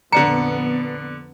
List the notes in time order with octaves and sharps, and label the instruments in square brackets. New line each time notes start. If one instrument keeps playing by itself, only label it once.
[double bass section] F2 A#2 B3 [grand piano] D3 D4 C#7 [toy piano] A#5